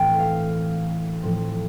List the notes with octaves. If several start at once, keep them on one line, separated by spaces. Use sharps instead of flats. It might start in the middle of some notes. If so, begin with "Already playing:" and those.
Already playing: A2 E3 A3 C4 G5
F5
A2 F3 C4